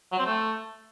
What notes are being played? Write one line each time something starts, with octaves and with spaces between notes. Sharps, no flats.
F#3
C4
A3